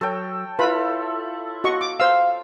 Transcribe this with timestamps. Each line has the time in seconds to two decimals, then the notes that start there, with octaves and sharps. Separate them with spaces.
0.01 F#3 A4 C#5 G5
0.59 E4 F4 A4 B4 B5
1.64 F#4 D#5 C#6
1.81 D6
2.00 C5 F5 E6